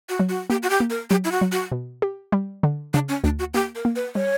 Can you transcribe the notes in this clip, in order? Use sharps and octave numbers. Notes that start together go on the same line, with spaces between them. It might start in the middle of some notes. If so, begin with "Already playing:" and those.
F#4
F#3
F#4
A#3 G4
F#4
G4
A#3
A#4
F#3 G4
E4
F#4
F#3
F#4
B2
G4
G3
D3
C#3 D4
C#4
D2 D4
F#4
A#3 G4
A#4
A#3
B4
G3 C#5